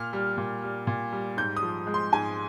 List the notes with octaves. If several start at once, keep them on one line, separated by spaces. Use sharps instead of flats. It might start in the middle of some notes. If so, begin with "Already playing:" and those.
Already playing: A#2 F6
G3
A#2
G3
A#2
G3
G#2 G6
D#6
F3
G#3
C6
G#2 G#5